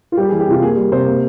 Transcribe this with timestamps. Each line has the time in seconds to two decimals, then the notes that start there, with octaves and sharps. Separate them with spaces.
0.12 F4
0.17 G3 G4
0.29 G#4
0.32 E3
0.40 G4
0.47 C3 F4
0.62 A#3 G#4
0.76 G3
0.92 C3 C5
1.07 A#3